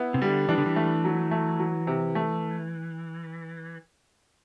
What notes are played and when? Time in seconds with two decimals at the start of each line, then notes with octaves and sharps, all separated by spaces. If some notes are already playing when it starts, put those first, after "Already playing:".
Already playing: B3 E4
0.14 C3
0.21 D3 G3
0.48 E3 D4
0.58 D3
0.66 E3
0.76 A3
1.05 F#3
1.31 A3
1.59 F#3
1.87 C3
2.15 A3